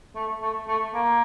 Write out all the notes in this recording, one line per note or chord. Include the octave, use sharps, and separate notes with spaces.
A3
A3
A3
A#3